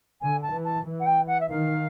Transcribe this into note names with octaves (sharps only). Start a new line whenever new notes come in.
D3 G#5
A5
E3
A5
E3
F#5
G5
F#5
E5
D#3 F5